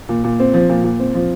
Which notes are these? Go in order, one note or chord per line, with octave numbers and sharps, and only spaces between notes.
A#2
A#2
C4
F3
A#2
A#2
C4
F3